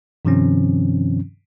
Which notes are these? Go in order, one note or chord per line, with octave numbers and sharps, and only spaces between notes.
G2 C3 D#3 F3 C4 C#4